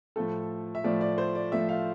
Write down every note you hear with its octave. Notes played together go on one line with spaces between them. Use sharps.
A2 F3 A3 A4
E5
A2 F3 A3 D5
D5
C5
D5
A2 F3 A3 E5
F5